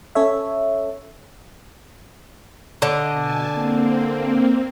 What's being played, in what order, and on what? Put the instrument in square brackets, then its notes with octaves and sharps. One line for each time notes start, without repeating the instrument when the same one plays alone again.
[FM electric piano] C#4 A4 C#5 E5
[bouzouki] D3 [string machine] D#5
[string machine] B2 G#5 A5
A#3 C4